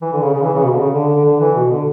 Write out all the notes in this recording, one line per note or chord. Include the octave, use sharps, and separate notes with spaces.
E3
D3
C#3
C#3
E3
C#3
B2
D3
C#3
D3
D3
D3
E3
B2
D3